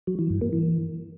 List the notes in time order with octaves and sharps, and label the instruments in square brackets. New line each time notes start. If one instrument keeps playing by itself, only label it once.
[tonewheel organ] F#3
E3
G2
A#3
E3